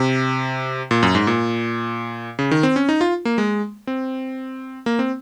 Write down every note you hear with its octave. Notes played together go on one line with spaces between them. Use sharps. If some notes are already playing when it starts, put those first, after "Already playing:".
Already playing: C3
A#2
F#2
G#2
A#2
C#3
D#3
C4
C#4
D#4
F4
A#3
G#3
C4
A#3
C4